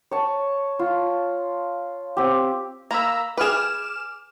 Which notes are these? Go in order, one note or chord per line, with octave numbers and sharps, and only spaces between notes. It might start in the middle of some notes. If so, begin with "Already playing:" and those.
C#5 A5
F4
C4 G4
A#3 A#5 B5 E6
G#4 B4 D6 F6 E7